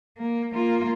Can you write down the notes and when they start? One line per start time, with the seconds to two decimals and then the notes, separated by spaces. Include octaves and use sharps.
0.18 A#3
0.54 A#3 F4